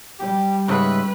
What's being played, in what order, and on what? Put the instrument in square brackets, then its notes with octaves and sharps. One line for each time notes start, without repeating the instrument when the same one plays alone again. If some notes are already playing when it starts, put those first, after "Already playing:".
[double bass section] G3 [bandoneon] G4
[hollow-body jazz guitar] G#2 C#3 [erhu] B4 [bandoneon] E5 F#6